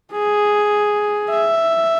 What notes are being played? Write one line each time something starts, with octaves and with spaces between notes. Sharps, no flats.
G#4
E5